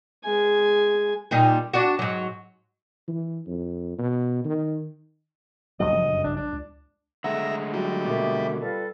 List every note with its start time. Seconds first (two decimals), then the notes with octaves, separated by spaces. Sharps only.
0.24 G#3 G#5
1.31 A#2 G3 D#4
1.73 D4 F#4
1.99 G#2 F#3
3.08 E3
3.47 F2
3.98 B2
4.44 D#3
5.80 F#1 D2 G2 F#3 D#5
5.93 F3
6.09 F#2
6.24 A#1 D4
6.36 D4
6.53 C#2
7.24 D3 G#3 A3 E5 F#5 A#5
7.73 F#3 G3
8.04 B2 A#3 E5 D6
8.61 G3 F4 A4 B4